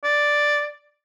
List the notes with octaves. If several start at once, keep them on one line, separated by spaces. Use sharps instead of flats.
D5